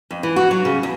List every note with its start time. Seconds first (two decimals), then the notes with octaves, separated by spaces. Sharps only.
0.11 F2
0.23 E3
0.36 F#4
0.51 F#3
0.65 C#3
0.83 E2